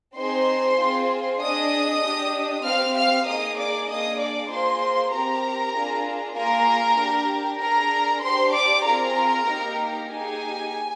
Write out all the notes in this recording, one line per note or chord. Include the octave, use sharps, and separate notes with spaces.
C4 D#4 G#4 C5 C6
C4 F4 G#4
D4 G#4 D#5 D#6
D4 G4
C4 G4 F5 F6
F5 F6
A#3 D#4 G#4 D#5 D#6
D5 D6
A#3 D4 G#4 D#5 D#6
D5 D6
A#3 F4 G#4 C5 C6
C4 G4 A#4 A#5
D4 F4 G#4
A#3 F4 G#4 A#4 A#5
D4 G4
D4 G#4 A#4 A#5
D4 G4 C5 C6
D5 D6
C4 F4 G#4 A#4 A#5
A#3 D#4 G4
A#3 D#4 G4 G#4 G#5